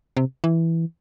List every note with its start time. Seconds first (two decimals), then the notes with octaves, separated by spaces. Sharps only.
0.17 C3
0.44 E3